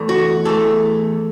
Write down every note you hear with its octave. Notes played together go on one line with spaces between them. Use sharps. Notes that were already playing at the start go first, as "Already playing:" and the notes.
Already playing: E2 E3 A3
F#4
E2 E3 A3 A4